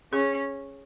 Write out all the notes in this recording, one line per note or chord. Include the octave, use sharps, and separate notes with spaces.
C#4 G#4